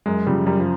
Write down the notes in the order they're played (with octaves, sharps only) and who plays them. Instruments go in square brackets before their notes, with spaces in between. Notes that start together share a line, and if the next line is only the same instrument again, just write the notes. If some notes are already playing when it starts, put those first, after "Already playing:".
[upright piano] F#2 [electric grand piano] G#3
[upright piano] C#3 F3 [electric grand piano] G3
[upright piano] F#2 [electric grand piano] G3
[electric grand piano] F3